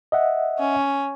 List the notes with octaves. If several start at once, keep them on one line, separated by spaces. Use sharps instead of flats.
D#5 E5 F#5
C#4